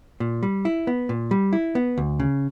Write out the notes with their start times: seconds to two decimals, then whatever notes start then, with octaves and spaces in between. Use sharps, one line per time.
0.20 A#2
0.43 G3
0.65 E4
0.87 B3
1.09 A#2
1.31 G3
1.53 E4
1.75 B3
1.98 D2
2.20 C#3